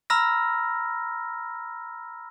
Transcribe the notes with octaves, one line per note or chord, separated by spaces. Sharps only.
A#5 B5 E6 F6 A#6